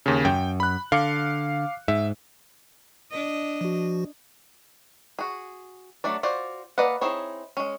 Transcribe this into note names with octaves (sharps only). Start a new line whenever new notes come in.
D#2 C#3
F#2 G5
B5 F#6
D3 F5 D6 C#7
G#2 E5
D4 D#5
F3 F#4
F#4 G#4
F#3 A3 D4 D5
F4 F#4 C5 D5
A#3 B4 D5 D#5 F#5
C4 D#4 E4 G#4 C#5
G#3 C#4